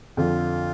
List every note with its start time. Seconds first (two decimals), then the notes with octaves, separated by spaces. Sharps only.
0.17 F2 D3 F3 F4